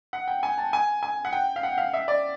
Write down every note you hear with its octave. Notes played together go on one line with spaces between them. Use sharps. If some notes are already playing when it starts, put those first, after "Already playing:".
F#5
G5
G#5
A5
G#5
G#5
F#5
G5
F5
F#5
F5
E5
D5